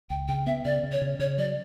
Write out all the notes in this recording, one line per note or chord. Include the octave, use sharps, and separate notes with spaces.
C#2 G5
C#3 G5
B3 E5
C#3 D5
C#3
C#5
C#3
C#3 C#5
F#3 D5